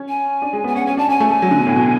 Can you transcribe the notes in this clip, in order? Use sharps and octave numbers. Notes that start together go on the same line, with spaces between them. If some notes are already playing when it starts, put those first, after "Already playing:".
Already playing: C#4
G#5
D4
G#3
B3
G#5
C#4 F#5
C#4 G#5
D4 A5
C#4 G#5
A3
A3
F#3
D3
B2
A2
B2